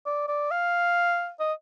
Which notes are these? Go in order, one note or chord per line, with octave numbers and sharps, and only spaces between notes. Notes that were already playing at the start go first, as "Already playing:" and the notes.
D5
D5
F5
D#5